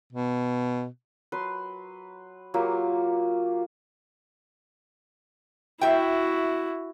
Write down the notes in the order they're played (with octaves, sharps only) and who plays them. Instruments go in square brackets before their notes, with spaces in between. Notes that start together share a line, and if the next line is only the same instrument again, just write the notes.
[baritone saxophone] B2
[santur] F#3 B4 C6
F#3 A#3 F4 G4
[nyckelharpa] E4 F#4 [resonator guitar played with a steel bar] E5 G5